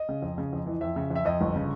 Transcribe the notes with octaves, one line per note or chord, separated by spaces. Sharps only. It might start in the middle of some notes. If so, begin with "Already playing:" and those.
Already playing: D#5
C#3
F2
C#3
F2
E3
F2 E5
C#3
F2
E5
F2 D#5
G1
C#3